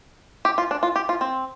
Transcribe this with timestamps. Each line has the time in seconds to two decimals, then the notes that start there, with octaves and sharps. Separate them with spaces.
0.45 G4
0.58 F4
0.71 D4
0.83 F4
0.96 G4
1.09 F4
1.21 C4